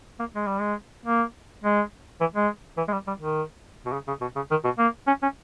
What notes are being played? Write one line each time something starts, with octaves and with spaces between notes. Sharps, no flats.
A#3
G#3
G3
G#3
A#3
G#3
E3
G#3
E3
G#3
G3
G3
D#3
B2
C#3
C#3
B2
C#3
D#3
B2
A#3
C#4
C#4